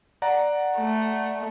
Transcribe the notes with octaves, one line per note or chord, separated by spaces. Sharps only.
D5 F#5 A#5
A3